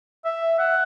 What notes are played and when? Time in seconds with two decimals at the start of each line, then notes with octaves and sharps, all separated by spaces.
0.25 E5
0.59 F#5